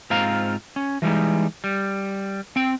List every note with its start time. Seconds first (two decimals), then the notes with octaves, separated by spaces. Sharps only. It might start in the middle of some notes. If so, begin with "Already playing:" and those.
0.10 G#2 C4 F4 F5 A#5
0.76 C#4
1.02 E3 F3 G3 G#3 D#4
1.64 G3
2.56 C4 G5